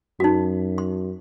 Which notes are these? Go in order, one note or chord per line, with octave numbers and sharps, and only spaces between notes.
F#2 D#4 F#4
C6